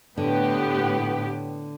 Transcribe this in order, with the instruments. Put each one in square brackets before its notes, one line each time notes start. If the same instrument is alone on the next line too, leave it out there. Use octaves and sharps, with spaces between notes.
[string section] A2 B3 G4 [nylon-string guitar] D3